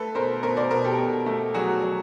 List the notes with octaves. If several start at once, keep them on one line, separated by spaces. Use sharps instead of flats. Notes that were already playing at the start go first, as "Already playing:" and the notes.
Already playing: A3 A4 B4
B2 A#4 C5
B2 A#4 C5
C5 D5
B2 A#4 C5
G4 A4
B2
A3
F#3 F#4 G#4
F#3